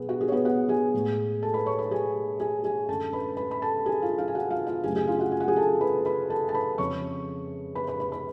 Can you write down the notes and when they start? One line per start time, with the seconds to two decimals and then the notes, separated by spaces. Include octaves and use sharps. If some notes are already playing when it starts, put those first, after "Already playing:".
Already playing: B2 F#3 B3 G#4 B4
0.09 F#4
0.21 G#4
0.28 C#5
0.32 B3 B4
0.45 F#4 F#5
0.69 G#4 G#5
0.94 A2 G#3
1.42 A4 A5
1.54 B4 B5
1.66 C#5 C#6
1.78 B4 B5
1.91 G#4 G#5
2.40 G#4 G#5
2.64 G#4 G#5
2.88 F#2 D3 G#3 A4 A5
3.13 B4 B5
3.37 B4 B5
3.51 B5
3.62 A4 A5
3.86 G#4 G#5
4.02 F4 F5
4.18 F4 F5
4.28 G#5
4.35 F#4 F#5
4.50 F4 F5
4.67 F4 F5
4.83 F#2 C#3 F#3 A3 G#4 G#5
4.95 G#4 G#5
5.07 F4 F5
5.19 F#4 F#5
5.32 G#5
5.40 F#5
5.48 G#4 G#5
5.56 A4 A5
5.81 B4 B5
6.05 B4 B5
6.30 A4 A5
6.49 A5
6.54 B4 B5
6.78 F2 C#3 F3 G#3 C#5 C#6
7.75 B4 B5
7.88 B4 B5
8.00 B4 B5
8.12 B4 B5